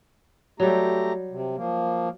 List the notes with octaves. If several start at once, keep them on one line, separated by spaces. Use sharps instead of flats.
F#3 G3 A3 G4 A#5
C3
F3 A#3